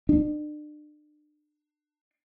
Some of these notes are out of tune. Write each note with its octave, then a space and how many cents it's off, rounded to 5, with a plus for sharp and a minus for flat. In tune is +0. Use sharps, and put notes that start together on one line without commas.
D4 +35